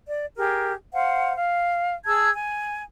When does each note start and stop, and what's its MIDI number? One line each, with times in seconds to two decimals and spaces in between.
0.08 0.26 74
0.36 0.72 67
0.36 0.72 68
0.36 0.72 70
0.93 1.33 72
0.93 1.33 77
0.93 1.33 78
1.35 1.93 77
2.05 2.29 68
2.05 2.29 81
2.05 2.29 88
2.05 2.29 92
2.34 2.82 80